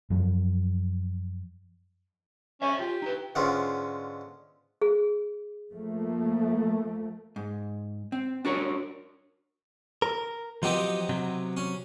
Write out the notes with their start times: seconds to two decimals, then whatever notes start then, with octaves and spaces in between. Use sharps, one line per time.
0.10 F#2 F3
2.62 C#4 C5 C#5 E5
2.79 F4 G4
3.02 D#4 B4
3.35 G#2 D3 G#3 B3 C#4 F4
4.82 G#4
5.72 F3 A3 A#3
7.36 G#2
8.12 C4
8.45 D4 F#4 A#4 C#5
10.02 A#4
10.63 F3 F#3 B3 C4 D#4 G4
11.09 C3 F#3
11.57 C#4